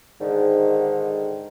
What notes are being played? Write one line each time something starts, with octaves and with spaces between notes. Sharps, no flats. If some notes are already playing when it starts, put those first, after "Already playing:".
G#2 D3 D#3